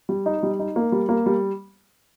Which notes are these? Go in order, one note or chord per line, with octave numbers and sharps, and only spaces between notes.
G3
D#4
G3
D#4
A#3
G3
A#3
G3